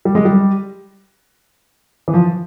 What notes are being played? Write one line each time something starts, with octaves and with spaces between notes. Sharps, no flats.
G3
G#3
G3
E3
F3